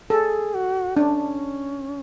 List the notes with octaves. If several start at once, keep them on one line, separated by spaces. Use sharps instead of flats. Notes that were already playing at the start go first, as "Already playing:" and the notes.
G#4 A4
F#4
C#4 D4